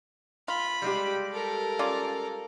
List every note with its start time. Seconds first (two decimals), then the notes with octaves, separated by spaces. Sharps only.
0.48 F4 B5
0.82 G3 G#3 G4
1.32 A4 A#4
1.79 C#4 F4 D5